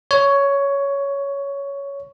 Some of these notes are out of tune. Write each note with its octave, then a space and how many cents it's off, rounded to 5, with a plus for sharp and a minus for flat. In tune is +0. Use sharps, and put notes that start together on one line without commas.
C#5 +10